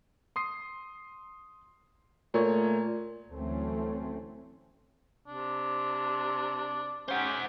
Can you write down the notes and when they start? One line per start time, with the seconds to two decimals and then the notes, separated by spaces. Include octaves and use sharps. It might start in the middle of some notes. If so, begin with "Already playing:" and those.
0.36 C6 D#6 C7
2.34 A#2 A3 C#5
3.30 D2 E3 F#3 A3 C4 C#4
5.27 C3 D4
7.09 C#4 G4 C5 F#5